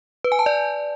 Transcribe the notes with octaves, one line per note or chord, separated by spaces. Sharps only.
B4
G#5
A5
D5